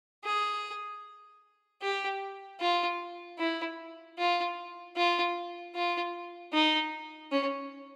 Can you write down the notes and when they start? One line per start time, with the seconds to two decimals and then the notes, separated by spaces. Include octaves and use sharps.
0.25 G#4
1.82 G4
2.61 F4
3.39 E4
4.18 F4
4.96 F4
5.75 F4
6.54 D#4
7.32 C#4